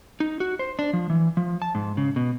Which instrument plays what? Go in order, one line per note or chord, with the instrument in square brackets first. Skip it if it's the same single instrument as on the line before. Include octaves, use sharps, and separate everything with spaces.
[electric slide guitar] D#4
F#4
C5
D4
F3
E3
F3
A5
G#2
C#3
B2